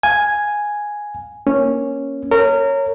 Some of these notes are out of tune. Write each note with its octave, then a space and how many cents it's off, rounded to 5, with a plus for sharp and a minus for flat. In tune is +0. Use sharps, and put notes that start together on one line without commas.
F5 +30 G#5 +0
A#3 +10 C#4 -5
A#4 -25 C#5 +0